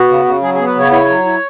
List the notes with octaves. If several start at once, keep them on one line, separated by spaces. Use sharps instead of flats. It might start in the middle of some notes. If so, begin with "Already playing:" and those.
Already playing: B3 F#4
C#3
C#3
F#3 G#4
B3 G#4
B4
C#3 C#5
E4 C#5
F#3
E4